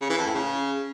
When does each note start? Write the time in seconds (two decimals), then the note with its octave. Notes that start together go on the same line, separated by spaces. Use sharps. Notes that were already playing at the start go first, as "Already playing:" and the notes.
0.01 C#3
0.09 E3
0.18 F2
0.26 A2
0.34 C#3